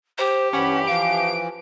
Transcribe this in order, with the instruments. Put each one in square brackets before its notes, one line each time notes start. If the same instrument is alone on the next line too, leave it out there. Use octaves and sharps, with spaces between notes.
[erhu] G4 [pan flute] C5
[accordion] G2 E3 B5 [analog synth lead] C#4 [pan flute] F#5
[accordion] E3 F3 [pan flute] F5 [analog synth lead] D7